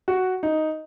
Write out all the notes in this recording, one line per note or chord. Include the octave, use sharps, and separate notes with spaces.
F#4
D#4